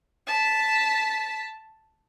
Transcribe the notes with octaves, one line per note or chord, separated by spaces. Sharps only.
A5 B6